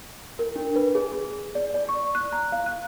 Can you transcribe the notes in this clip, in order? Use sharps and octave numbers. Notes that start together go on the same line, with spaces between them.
A#4
D4
B4
G#4
G#4
D5
D5
C#6
F#6
A#5
F5
F#6